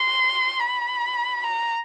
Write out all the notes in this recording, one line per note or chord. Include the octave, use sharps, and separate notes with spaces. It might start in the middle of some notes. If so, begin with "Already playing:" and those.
Already playing: C6
B5
A#5